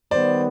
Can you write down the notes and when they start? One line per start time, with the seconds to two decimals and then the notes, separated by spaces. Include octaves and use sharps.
0.11 D#3 G3 B3 C5 D5